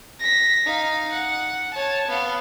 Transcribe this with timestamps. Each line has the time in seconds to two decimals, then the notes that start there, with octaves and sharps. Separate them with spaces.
0.20 A#6 B6
0.65 D#4 F5
1.12 F#5
1.74 C#5 A5
2.08 B3 F5